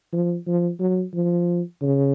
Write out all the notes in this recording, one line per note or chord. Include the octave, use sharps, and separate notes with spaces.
F3
F3
F#3
F3
C#3